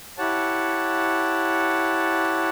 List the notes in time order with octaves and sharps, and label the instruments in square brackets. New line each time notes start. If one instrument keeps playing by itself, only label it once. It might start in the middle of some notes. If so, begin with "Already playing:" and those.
[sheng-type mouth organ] E4 G4 C#5 F#5 A5